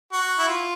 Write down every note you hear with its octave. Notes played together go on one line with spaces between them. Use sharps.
F#4
E4
F4